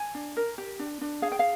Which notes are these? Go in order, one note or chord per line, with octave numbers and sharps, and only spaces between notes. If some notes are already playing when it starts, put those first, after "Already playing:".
Already playing: G#5
D4
A#4
G4
D4
D4
G#4 F5
G5
F5